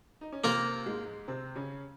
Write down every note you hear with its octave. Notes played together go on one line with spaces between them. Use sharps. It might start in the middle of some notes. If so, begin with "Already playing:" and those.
D#4
C#4
C3 A#3 C4 F4 A#4
G#2 G#3
C3 C4
C#3 C#4